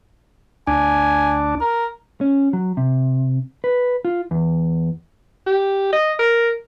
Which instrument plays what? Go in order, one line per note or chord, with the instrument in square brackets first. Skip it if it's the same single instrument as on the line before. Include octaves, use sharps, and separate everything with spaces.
[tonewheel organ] D2 D4 [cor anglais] G#5
[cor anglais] A#4
[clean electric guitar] C#4
F#3
C3
B4
F4
E2
[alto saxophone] G4
D#5
A#4